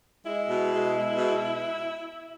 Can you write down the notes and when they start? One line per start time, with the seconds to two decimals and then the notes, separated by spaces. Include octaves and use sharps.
0.24 G#3 E4
0.47 B2
0.70 G#3
0.92 G#3
1.15 B2